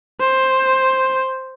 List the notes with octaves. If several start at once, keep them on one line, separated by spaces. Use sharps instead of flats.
C5